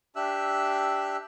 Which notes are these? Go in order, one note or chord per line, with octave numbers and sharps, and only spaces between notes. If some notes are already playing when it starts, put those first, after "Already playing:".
D4 G4 E5 E6 F#6